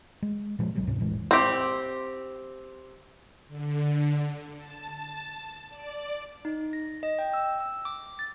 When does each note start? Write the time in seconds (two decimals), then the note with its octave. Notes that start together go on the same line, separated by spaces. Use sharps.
0.22 G#3
0.59 A#2 F3 G#3
0.75 A1 B2 F#3 G3
0.87 C#2 G#2 C3 C#4
1.00 F1 A2 E3 G#3
1.31 C4 G4
3.48 D3
4.58 A5
5.69 D5
6.45 D#4
6.73 A#6
7.03 D#5
7.19 G5
7.34 E6
7.60 E6
7.85 D6
8.19 A6